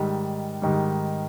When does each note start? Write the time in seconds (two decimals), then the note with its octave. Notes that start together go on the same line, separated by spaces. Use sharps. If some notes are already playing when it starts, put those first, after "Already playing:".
Already playing: G#2 D#3 G3
0.62 G#2 D#3 G3